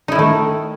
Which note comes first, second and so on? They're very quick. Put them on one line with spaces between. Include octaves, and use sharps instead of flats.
D#4 E4 D#3 A3